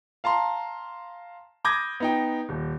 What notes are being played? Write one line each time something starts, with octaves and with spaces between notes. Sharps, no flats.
F5 A5 A#5 C6
B5 D6 D#6 G6 G#6 A#6
B3 D#4 G5
D#1